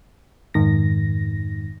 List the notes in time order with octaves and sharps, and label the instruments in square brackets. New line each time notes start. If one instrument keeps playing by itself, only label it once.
[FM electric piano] F2 G#2 D#3 A#6